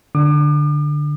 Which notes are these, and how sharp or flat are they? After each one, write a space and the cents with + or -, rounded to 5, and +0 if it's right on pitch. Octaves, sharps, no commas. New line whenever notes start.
D3 +5 D6 +40